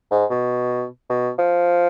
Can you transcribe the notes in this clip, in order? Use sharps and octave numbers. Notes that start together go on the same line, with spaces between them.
G#2
B2
B2
F3